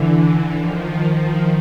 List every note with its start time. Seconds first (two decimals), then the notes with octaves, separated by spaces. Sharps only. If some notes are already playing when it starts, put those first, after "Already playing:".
Already playing: D3 E3
0.57 D#3 F3